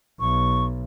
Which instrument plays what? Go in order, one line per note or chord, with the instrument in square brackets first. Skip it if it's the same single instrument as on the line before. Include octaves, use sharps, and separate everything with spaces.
[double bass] B1 [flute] C#6